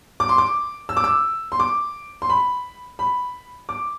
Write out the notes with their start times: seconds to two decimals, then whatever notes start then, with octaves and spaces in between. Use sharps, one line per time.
0.20 D6
0.29 C6
0.38 D6
0.89 E6
0.97 D6
1.04 E6
1.52 C6
1.60 D6
2.22 C6
2.30 B5
2.99 B5
3.69 D6